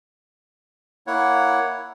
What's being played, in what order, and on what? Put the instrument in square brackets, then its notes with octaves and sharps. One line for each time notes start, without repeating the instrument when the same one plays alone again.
[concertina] A#3 E4 C#5 F#5